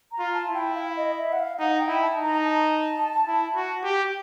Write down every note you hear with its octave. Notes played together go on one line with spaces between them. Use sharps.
A#5
F4
A5
E4
G5
F5
D#5
E5
F#5
F5
D#4 F#5
F#5
G5
E4
A5
D#4
A#5
A5
E4
F#4
G4